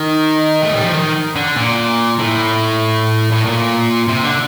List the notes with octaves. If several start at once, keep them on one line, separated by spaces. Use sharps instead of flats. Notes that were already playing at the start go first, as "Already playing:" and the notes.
Already playing: D#3
A3
G3
F3
D#3
D3
A#2
A2
A2
A#2
C3
D3